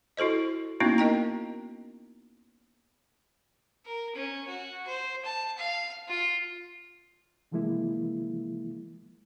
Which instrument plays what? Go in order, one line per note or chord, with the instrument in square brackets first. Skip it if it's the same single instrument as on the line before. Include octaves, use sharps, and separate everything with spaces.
[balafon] E4 F#4 A4 C5 D#5
A#3 B3 C#4 D#4 E4 F#4
A#4 D#5 G5 A#5
[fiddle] A#4
C#4
F#4
C5
A5
F5
F4
[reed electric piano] C3 E3 F3 G#3 A#3 E4